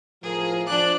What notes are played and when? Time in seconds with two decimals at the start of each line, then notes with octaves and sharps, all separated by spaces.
0.23 A2 F3 G#4 A#4
0.67 F3 D4 D5 F#6